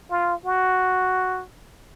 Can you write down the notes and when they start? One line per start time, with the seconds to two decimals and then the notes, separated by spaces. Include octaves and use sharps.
0.10 F4
0.45 F#4